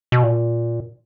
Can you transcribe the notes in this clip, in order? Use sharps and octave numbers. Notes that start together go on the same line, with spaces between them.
B2
A#2